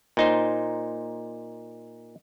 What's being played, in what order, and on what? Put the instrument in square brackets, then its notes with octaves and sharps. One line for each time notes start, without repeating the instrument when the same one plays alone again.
[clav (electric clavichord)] A#2 D#4 C5